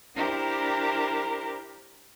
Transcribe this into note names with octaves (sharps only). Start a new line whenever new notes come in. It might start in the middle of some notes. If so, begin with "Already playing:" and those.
D4 E4 G4 A#4 C5 A#5